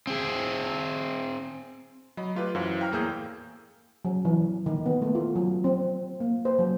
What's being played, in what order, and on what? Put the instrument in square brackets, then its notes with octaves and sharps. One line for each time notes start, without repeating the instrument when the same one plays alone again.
[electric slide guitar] C4 G#4
[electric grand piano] F#3 D#5 B5
A3 F4 G4 B4
F#2 E3 F#4 C5 F5 G6
F5 G5 A#5 F6
E2 A2 A#3 G#4 E6 G6
[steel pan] F#3
E3
D#3
B3
A3
F4
F#3
C4
A#3
C5
F#3